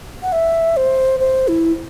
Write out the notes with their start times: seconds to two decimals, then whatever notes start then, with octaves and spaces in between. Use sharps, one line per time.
0.23 F#5
0.32 E5
0.77 C5
1.20 C5
1.48 E4